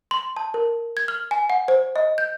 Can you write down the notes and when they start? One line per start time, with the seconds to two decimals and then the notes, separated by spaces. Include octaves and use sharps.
0.11 C6
0.37 A5
0.54 A#4
0.97 G#6
1.08 F6
1.31 G#5
1.50 F#5
1.68 C5
1.96 D#5
2.18 G6